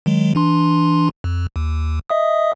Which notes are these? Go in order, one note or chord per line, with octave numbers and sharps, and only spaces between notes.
D#3 F#3 G#3
E3 D4 C6
F2
D#2
D#5 E5 D#6